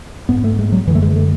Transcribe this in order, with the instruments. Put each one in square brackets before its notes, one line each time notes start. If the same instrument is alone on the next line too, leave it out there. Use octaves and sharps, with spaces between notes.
[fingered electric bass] G#2 B3
A3
G#3
F#3
F#2 E3
D3
A3
G#3
A3